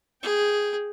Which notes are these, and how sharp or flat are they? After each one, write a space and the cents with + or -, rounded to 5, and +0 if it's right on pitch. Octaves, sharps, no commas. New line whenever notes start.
G#4 +0 G5 +0